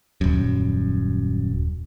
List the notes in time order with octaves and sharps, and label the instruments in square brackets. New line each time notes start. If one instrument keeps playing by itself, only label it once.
[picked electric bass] D#1 F#2